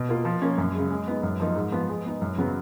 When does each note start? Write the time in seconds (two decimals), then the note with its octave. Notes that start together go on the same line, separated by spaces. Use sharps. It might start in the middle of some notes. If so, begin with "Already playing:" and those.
Already playing: B2
0.09 A#3 F4
0.25 F3
0.42 A#3 C#4
0.58 F#2
0.74 C#3 G#3
0.90 G#3
1.07 B3 D#4
1.23 F#2
1.40 F3 A#3 D#4
1.56 G#2
1.72 F3 B3
1.89 G#3
2.05 B3 D#4
2.21 F#2
2.37 C#3 F#3 B3